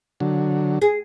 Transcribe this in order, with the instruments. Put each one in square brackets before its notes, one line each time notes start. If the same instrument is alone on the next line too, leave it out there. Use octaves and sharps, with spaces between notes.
[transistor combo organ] D3 F#3
[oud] G#4